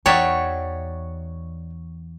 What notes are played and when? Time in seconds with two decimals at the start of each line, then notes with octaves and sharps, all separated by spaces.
0.06 E2 D#4 F#4 C#5 D5 E5 G5